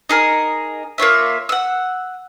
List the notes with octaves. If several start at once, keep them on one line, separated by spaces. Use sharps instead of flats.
D#4 G#4 A#4
A#3 F4 C#5 E5
F#5 E6